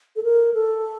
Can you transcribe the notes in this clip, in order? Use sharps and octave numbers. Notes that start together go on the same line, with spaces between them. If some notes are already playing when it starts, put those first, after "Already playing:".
A4
A#4
A4